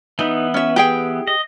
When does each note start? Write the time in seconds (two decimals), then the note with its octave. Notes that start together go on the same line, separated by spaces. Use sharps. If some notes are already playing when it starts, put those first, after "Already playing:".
0.19 E3 B3 D#4
0.54 C#4 E5
0.76 G4 G#4 G5
1.27 D#5